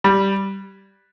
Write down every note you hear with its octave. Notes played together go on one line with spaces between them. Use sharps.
G3